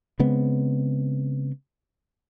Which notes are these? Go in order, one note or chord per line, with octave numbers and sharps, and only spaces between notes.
C#3 G#3 B3 C4